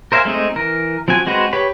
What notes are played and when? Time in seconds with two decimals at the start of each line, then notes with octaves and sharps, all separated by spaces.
0.12 A#4 C5 E5 F5 G#5
0.25 G#3 A3 C4 D#4 E5
0.56 E3 A#4
1.08 F3 C4 F#4 G#5
1.27 G#3 C4 F#4 B4 C5
1.53 G4 B4 C#5 B5